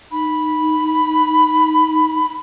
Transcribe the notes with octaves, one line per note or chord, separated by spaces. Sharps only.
D#4 B5